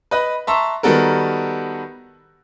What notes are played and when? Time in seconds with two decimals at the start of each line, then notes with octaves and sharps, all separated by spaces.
0.11 B4 D#5 F#6
0.47 E5 A5 A#5 C6 C#6 E6
0.83 D#3 G3 B3 F#4 A4 A#4